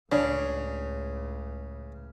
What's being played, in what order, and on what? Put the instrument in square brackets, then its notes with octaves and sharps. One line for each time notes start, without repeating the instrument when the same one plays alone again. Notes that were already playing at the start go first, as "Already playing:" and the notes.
[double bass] C#2 A2 [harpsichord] C#3 [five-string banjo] D4 C#5